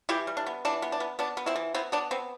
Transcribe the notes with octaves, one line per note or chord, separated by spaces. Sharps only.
E3 E4 G4
G3
D4
B3
E3 D4
B3
D4
B3
B3 D4
B3
C4 E4
E3
B3 C4 E4
B3 D4
B3 C4